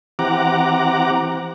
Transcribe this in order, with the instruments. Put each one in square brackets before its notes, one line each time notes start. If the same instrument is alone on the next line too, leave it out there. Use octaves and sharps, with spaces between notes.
[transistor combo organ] E3 C4 G4 F#5 A#5 D6